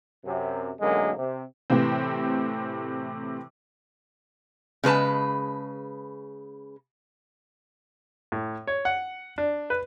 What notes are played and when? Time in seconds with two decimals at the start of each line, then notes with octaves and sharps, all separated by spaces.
0.25 F#2 C3
0.80 B1 F#2 D3 G#3 A#3
1.17 C3
1.70 A2 C3 E3 C4
4.84 C#3 G#3 B4 A5
8.32 A2
8.67 C#5
8.85 F#5
9.38 D4
9.70 B4